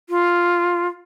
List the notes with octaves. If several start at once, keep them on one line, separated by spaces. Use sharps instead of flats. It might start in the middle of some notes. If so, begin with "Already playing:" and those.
F4